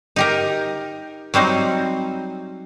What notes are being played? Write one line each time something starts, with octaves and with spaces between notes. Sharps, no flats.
D#4 G4 A#4
F#3 G3 C4 D#4